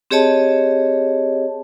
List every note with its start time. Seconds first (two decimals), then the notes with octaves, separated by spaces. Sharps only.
0.11 C4 G4 G#4 C#5 D#5 A5